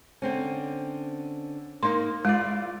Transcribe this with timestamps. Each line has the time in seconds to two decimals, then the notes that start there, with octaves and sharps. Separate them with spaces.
0.22 D3 C4 C#4
1.83 A#3 D#4 C6
2.25 G#3 E4 F4 D5